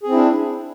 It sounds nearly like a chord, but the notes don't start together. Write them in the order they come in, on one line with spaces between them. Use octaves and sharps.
G#4 C4 E4 D4